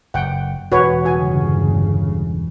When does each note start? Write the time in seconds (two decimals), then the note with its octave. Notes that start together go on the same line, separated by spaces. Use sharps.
0.14 F#1 F#5 G5
0.72 E1 F#4 B4 C#5
1.05 G1 C#3 F#4 G#5